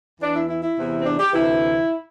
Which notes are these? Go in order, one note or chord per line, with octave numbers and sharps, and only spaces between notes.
E2 E3 D4
E4
E4
E4
E2 C3 E3
C4
D4
G4
D2 C3 E3 E4